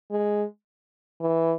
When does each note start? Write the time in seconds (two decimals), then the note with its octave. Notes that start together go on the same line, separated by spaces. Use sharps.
0.10 G#3
1.20 E3